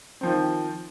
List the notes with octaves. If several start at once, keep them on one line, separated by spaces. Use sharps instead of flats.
D#3 F3 C4